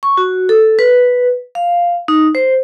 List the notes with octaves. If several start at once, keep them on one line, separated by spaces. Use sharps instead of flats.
C#6
F#4
A4
B4
F5
D#4
C5